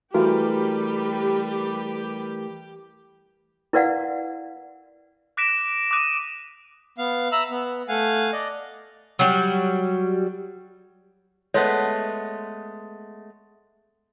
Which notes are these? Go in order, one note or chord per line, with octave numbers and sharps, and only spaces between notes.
E3 G3 A3 F#4 G4 A#4 B4
E4 A#4 B4 D5 F5 F#5
D6 F#6 A#6 B6 D7 E7
D6 D#6 F#6 D#7
B3 F5
E5 A#5 B5 E6
B3
A3 F5 F#5 G#5
D5 D#5
F#3 G3
G#3 A3 B3 C#5